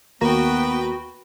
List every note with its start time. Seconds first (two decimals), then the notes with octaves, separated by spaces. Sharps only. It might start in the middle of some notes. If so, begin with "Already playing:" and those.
0.21 D#2 A#3 B3 F#4 B4 G5 A#5